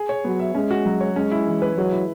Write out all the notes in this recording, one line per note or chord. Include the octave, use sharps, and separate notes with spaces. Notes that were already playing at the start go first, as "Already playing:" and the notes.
Already playing: G#4
C#5
F#3 B3
E5
G#3 C#4
F#4
F#3
C#5
G#3 C#4
E4
E3
B4
F#3 G#3
E4